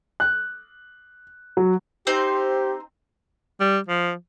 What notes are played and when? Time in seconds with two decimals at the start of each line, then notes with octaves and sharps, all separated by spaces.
0.20 F#6
1.57 F#3
2.07 C4 D#4 G4 C5
3.60 G3
3.88 F3